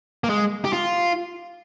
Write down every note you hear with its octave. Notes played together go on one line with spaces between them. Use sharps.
A#3
G#3
G4
F4